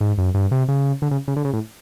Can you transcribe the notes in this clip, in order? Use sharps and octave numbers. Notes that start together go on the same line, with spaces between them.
G#2
F#2
G2
C3
C#3
D3
C#3
C#3
D3
C#3
A2